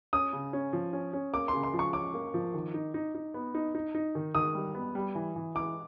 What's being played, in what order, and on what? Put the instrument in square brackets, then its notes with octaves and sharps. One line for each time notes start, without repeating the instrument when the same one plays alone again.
[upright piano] C#4 [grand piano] D#6
[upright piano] C#3
C#4
F3
C#4
C#4
[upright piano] A#3 [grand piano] D6
[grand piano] C6
[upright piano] C#3
[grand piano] C6
[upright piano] F3
[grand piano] C#6
[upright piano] C#4 [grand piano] D6
[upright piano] A#3
F3
D#3
D#4
D#4
D#4
B3
D#4
D#4
D#4
D#3
[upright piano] D#3 [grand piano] D#6
[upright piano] G3
B3
G3
E3
E3
[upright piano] E3 [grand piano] D6